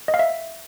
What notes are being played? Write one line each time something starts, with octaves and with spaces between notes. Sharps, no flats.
D#5
F5
E5